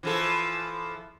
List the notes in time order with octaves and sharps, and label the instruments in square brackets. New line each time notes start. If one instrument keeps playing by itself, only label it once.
[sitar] E3 F3 A4